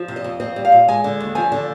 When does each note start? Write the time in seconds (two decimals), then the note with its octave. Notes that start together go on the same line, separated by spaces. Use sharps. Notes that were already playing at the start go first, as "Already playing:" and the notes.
Already playing: F3
0.08 C3
0.16 D#5
0.24 F2
0.40 C4 D#5
0.56 G3
0.65 F5
0.72 A#2
0.88 G#3 G#5
1.04 D3
1.20 D#2
1.35 F3 G#5
1.52 D3